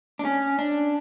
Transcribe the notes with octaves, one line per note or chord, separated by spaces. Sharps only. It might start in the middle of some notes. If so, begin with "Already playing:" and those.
D4
C#4
D4